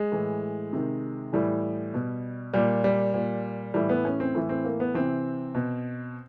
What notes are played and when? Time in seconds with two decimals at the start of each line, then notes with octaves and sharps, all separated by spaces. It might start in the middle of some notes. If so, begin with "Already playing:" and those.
Already playing: G#3
0.12 A2 E3
0.73 C3 D#3
1.33 A2 E3 G3
1.94 B2
2.54 A#2 G3
2.84 G3
3.14 A#2
3.74 A2 E3 G3
3.89 B3
4.05 C#4
4.20 C4
4.35 A2 E3
4.49 C4
4.65 A#3
4.80 B3
4.94 C3 E3 C4
5.55 B2